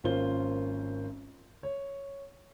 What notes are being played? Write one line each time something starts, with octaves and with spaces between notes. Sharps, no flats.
G#1 A#3 C#4 F4 C5 G7
C#5